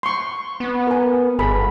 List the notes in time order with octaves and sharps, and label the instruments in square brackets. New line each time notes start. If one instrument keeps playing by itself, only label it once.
[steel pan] C6 C#6
[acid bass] B3
[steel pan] A#4 G#5
[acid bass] G1 [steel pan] G#4 A4 B5